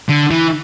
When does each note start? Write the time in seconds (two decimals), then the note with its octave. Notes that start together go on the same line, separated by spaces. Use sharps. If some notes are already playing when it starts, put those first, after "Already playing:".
0.09 D3
0.31 E3